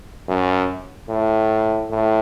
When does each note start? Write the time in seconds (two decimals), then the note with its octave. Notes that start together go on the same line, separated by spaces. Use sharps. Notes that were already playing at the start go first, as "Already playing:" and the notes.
0.28 F#2
1.09 A2
1.90 A2